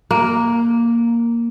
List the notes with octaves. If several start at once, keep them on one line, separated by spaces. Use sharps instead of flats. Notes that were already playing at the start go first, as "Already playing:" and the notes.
A#3